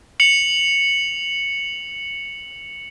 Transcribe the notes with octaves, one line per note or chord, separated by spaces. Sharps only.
C#7 F7 F#7